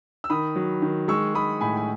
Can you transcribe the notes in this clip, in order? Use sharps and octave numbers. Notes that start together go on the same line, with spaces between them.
E6
D#3 B5 D#6
F#3
D#3
G#3 C#6 E6
G#3 B5 D#6
A2 G#5 B5
G#5